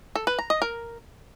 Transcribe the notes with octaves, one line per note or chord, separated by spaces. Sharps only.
A4
B4
A#5
D#5
A#4